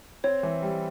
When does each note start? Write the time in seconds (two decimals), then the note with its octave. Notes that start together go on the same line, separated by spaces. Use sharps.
0.24 C4 C#5
0.43 E3
0.62 G3